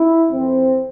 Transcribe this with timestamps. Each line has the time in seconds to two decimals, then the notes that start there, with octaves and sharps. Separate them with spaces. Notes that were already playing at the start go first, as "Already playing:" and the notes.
Already playing: E4
0.31 F2 E3 C4